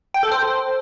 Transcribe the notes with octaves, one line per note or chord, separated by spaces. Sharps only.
G5
A4
C5